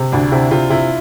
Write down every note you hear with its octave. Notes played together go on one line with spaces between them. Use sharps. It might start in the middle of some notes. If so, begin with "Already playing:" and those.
Already playing: C3
D2 D4
C3 E4
C3 F4
C3 E4